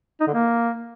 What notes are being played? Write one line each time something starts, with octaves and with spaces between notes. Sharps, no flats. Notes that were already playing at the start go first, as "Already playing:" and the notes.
D#4
D3
A#3